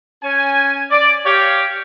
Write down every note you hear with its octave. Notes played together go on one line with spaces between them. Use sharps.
C#4 G#5
D5
G4 C#5 F5